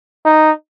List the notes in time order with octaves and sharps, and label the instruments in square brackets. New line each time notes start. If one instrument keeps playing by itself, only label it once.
[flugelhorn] D#4